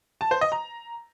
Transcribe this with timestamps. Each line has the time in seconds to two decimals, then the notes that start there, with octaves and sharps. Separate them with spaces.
0.21 A5
0.31 C5
0.41 D#5
0.52 A#5